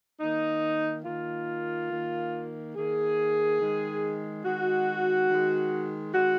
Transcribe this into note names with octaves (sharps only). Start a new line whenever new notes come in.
D#3 A#3 D#4
D#3 A#3 F4
D#3 A#3
D#3 A#3 G#4
D#3 G#3
D#3 G#3 F#4
D#3 G#3
D#3 G#3 F#4